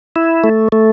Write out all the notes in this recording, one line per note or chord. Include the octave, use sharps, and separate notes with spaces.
E4
A3
A3